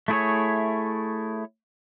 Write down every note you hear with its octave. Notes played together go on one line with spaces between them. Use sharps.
A3 E4 G#4 C#5